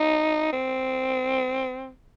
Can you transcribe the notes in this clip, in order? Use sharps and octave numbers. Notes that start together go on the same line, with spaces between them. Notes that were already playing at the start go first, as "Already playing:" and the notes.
Already playing: D#4
C4